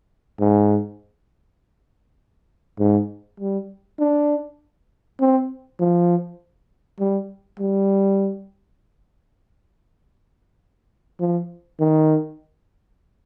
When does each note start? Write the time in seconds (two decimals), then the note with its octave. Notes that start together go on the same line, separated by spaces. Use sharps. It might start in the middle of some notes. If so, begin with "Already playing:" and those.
0.40 G#2
2.79 G#2
3.40 G3
3.99 D4
5.20 C4
5.80 F3
7.00 G3
7.60 G3
11.20 F3
11.80 D#3